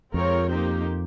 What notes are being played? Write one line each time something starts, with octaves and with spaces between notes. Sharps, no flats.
F2 G#3 C4 F4 A#4 C#5
A#3 D#4 G4 C5